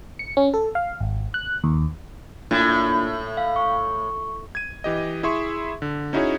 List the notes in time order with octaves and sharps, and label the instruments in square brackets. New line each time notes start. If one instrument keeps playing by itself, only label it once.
[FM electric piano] C#7
C#4
A4
F5
G#1
F#6
D#2
[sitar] A2 [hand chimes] A#3 D4 F4
[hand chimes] F5
C#6
[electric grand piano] G#6 D#7
E3 G4 D#5
E4 G#4 E5 C6 C#6
D3
C#4 D#4 E4 F#4 G#4 C#5